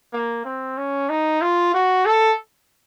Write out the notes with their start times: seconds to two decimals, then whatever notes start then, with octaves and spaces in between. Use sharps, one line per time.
0.13 A#3
0.45 C4
0.77 C#4
1.09 D#4
1.41 F4
1.74 F#4
2.06 A4